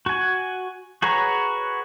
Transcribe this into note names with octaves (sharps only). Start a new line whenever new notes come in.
F#4 G#5
F#4 G#4 B4 C#5 A#5